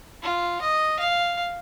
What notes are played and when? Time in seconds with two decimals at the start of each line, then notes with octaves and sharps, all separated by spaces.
0.23 F4
0.61 D#5
1.00 F5